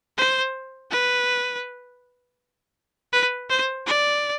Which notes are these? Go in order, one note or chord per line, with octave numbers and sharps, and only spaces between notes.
C5
B4
B4
C5
D5